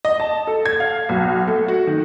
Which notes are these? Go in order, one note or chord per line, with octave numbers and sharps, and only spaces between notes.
D#5
A5
A4
G#6
F5
B1
A3
F#4
D#3